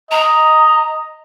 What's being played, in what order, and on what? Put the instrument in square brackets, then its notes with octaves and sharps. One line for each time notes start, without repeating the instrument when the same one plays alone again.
[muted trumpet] D#5 [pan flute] A#5